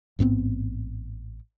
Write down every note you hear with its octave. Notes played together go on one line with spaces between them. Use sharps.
A1 G#2 B3 C4